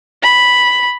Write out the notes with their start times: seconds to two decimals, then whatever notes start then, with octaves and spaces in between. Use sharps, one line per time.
0.23 B5